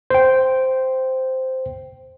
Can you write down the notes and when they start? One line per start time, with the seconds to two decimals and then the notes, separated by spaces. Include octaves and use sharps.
0.10 C5 G5